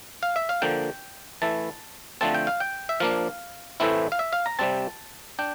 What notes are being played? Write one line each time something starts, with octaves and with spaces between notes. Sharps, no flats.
F5
E5
F5
D3 F3 A#3 G5
E3 A3 E4 A5
D3 F3 A3 C4 A5
G5
F5
G5
E5
F3 A#3 D4 F5
A2 E3 A3 C4 E4
F5
E5
F5
A#5
C3 G3 C4 A5
D4 G5